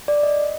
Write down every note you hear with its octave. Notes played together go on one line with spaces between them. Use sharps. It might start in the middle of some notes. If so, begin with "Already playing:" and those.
D5
D#5